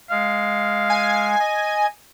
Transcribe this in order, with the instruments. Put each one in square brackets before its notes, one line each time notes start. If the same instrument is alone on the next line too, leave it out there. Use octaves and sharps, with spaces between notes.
[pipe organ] G#3 [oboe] F5
[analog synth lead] G#5
[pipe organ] D#5